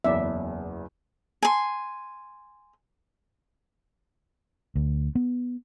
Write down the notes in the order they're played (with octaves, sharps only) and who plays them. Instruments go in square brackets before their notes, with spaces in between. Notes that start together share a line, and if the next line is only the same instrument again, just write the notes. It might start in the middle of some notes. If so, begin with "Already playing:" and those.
[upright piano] F#1 E2 [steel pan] D5 E5
[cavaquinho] G#5 C6
[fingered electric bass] D2
B3